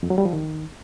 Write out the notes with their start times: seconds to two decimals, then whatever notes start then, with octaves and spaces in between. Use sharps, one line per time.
0.03 F2
0.10 F#3
0.18 G3
0.25 F3
0.33 D#3